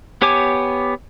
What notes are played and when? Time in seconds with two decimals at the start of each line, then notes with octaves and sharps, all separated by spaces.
0.22 B3 G4 C#5 G#5 D6